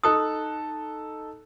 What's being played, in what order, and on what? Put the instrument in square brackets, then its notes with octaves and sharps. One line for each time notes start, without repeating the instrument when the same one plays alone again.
[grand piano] D#4 A4 F#6 [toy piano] D#6